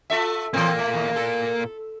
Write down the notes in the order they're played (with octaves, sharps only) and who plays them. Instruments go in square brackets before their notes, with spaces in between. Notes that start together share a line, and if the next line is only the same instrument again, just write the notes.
[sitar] F4 A4 E5
[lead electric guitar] A#2 A#3 [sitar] E3 C4
[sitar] A3
D#2
A4